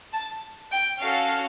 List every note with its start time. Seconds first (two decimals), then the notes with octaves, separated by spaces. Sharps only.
0.13 A5
0.71 G5
1.00 C#4 F#4 A4 F5